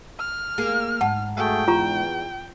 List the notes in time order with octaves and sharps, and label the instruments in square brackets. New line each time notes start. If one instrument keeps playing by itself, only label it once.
[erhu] F6
[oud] A#3 G#4
[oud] G#2 [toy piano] F#5 A5
[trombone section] A3 F#4 G#4 [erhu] G5
[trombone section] E2 [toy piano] F4 A#5 C#6